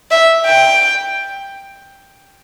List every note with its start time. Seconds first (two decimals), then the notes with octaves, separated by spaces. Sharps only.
0.11 E5
0.46 G5